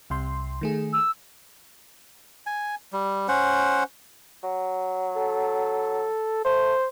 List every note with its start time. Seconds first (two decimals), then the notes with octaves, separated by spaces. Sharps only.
0.10 C2 C3 C6
0.61 D#3 A3 G#4
0.93 E6
2.46 G#5
2.93 G3
3.28 C#4 C5 F#5
4.43 F#3
5.16 A4
6.45 A3 C5